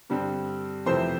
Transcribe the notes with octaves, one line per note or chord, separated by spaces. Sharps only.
G2 D3 G3 C4
F2 C3 E3 A3 C4 C5